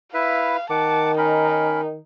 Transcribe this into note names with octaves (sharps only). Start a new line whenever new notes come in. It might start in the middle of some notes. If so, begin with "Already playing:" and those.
E4 B4 E5 F5
D#3 F#5 A5 D6
C#4 D#4 A#4 B5